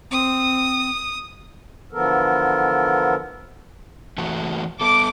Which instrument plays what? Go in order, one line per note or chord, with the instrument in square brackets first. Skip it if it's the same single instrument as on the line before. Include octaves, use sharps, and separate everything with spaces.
[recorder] C4 [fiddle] D#6
[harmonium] D3 E3 F3 B3 A4 A#4
[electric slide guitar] E3 A3 F#4
[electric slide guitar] B3 A4 [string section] D6